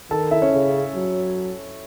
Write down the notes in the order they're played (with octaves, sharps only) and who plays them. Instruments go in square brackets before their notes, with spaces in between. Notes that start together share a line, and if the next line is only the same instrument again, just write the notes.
[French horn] D#3 [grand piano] A4 A5
[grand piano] E4 E5
C#4 C#5
[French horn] C#3
F#3